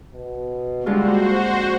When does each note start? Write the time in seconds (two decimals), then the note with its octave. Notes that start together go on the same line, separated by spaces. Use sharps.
0.13 B2
0.86 D3 G3 G#3 A#3 F4 F#4 C5
1.33 F2